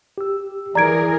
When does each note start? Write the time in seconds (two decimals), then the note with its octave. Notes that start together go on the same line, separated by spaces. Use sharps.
0.18 G4 E6
0.75 E3 G#4 A#4 D5 A#5 G#6 D7